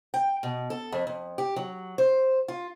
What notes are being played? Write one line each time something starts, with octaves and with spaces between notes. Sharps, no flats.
G5
B2
A4
F2
F2
G4
F#3
C5
F4